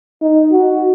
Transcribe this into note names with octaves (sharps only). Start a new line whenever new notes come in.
D#4
F#4